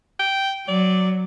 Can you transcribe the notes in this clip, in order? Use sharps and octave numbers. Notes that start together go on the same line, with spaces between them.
G5
F#3 D5